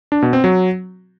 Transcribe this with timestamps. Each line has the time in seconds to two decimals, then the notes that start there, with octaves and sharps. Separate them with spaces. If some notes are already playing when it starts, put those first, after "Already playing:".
0.12 D4
0.22 B2
0.33 C4
0.44 F#3